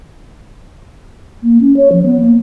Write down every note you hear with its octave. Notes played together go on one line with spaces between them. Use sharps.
A#3
C#4
C#5
F3
B3
A#3